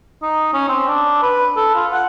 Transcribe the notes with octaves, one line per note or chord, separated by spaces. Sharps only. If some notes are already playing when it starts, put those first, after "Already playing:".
D#4
C#4
C4
D4
B4
A4
F4
F#5